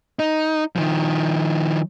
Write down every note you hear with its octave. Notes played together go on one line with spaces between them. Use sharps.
D#4
D#3 F3